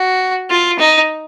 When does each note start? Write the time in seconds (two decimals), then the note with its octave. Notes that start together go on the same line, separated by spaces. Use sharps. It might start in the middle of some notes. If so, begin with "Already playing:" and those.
Already playing: F#4
0.50 F4
0.79 D#4